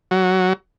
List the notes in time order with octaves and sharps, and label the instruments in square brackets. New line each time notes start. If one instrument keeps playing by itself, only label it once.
[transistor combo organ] F#3